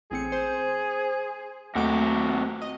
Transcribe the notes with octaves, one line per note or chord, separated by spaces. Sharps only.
A1 C4 G#4 C#7
C5
D#2 C3 F#3 A3 F#4 D6
D#5